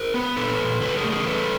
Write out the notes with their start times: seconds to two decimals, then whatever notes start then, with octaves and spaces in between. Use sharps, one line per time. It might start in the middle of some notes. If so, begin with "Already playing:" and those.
Already playing: A#4 C5
0.14 B3
0.36 A#2 A4 B4
0.59 A#2
0.81 C#3 A4 B4
0.96 G#4 A#4
1.04 A3
1.11 G#4 A#4
1.25 C#3 A4 B4